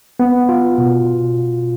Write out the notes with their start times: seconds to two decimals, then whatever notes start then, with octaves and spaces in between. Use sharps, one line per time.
0.20 B3
0.49 F4
0.78 B2